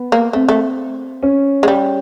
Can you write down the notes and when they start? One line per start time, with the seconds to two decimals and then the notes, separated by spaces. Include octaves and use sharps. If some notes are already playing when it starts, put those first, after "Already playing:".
Already playing: B3
0.12 A#3
0.33 A3 C4
0.49 A3
1.23 C#4
1.63 G#3
1.68 G3